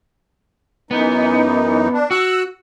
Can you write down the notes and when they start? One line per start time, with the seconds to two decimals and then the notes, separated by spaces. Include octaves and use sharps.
0.91 F#2 E3 B3 D#4
1.93 D4
2.11 F#4 E6 F#6